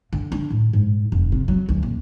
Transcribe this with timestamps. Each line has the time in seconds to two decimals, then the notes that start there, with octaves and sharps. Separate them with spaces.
0.13 D3
0.32 D4
0.50 A2
0.73 G#2
1.12 F1
1.32 C3
1.48 F#3
1.69 D2
1.83 D#1